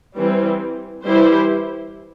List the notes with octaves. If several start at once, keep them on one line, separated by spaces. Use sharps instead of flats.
E3 G3 C4
E3 G3 E4 G4 C5